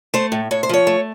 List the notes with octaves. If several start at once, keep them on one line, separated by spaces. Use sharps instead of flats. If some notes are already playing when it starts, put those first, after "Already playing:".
A3 C5
A2
A2 C#5
C5
F3 C#5
A3